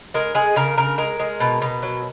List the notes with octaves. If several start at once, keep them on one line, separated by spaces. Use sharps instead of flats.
G#3 A#4
G#3 G#4
C#3 A#4
C#3 A#4
G#3 A#4
G#3
B2
B2
F#3